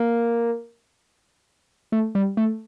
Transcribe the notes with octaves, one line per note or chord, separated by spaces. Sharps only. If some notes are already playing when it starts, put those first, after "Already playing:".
Already playing: A#3
A3
G3
A3